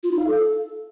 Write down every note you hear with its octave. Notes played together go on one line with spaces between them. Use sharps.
F4
D#4
F5
A4